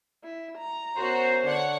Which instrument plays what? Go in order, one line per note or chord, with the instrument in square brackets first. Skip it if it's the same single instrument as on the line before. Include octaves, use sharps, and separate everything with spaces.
[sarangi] E4
A#5
[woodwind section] F#2 B3 C5 [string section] F#4
[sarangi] D3 [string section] C#5 F#5